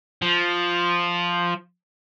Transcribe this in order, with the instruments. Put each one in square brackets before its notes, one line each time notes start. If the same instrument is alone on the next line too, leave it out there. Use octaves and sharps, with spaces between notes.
[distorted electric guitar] F3